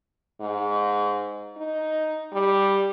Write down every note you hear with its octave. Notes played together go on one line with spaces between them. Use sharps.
G#2
D#4
G3